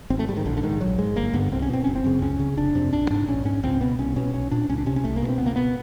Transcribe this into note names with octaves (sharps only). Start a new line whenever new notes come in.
G#1 C4
A3
G#2 G3
D#3
A#1 D3
D3
G#2 D#3
A#1 F#3
G#2 G#3
G1 A#3
G2 D3 B3
C2 C4
C#4
B2 C4
F#1 C#4
C4
F#2 C#3
C#2 C#4
C#3
F1 D4
F2 C3
A#1 D4
G#2 D4
A#1 C#4
G#2 C#4
C#2 C4
B2 B3
C2 C#4
B2 C#4
B1 C#4
A#2 D4
C#2 C#4
D4
C3 C#4
C#4
C2 A3
A#3
B2
C4
C#2 B3
A#3
B2 B3